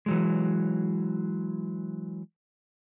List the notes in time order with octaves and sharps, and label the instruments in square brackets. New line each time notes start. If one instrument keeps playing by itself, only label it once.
[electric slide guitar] E3 F#3 G#3